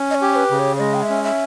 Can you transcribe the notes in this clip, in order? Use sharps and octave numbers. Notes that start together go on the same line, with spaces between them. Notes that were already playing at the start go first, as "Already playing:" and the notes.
Already playing: C#4
D#5
C#5
G4
C#5
B4
C#3
C#5
C#5
G#3 D#5
G5
E5
C#4
E5